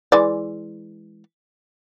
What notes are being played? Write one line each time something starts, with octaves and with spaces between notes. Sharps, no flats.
E3 G#3 D5